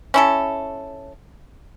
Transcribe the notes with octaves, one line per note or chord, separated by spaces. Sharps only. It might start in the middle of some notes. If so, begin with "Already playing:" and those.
C#4 E4 A4